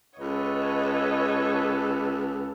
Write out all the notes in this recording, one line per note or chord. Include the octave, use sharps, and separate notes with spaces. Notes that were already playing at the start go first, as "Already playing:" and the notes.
C#2 A4 B4 C#5 D#5